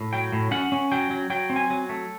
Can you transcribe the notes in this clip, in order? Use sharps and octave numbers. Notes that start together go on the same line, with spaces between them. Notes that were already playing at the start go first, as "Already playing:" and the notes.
Already playing: A2
F#3 G5
A2
C#4 F#5
C#4
F#3 G5
F#3
F#3 G5
C4
G#5
F#3
A3